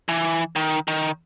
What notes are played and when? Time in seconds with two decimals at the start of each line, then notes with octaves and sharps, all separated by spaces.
0.09 E3
0.56 D#3
0.88 D#3